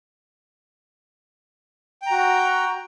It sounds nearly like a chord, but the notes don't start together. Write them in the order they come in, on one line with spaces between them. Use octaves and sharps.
G5 A#5 F#4